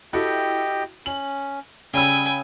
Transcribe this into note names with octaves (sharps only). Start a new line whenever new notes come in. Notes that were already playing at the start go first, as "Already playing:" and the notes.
E4 F#4 G4 A4 D#5 G5
C#4 F#7
C#3 G3 G5 G#5 B5 E6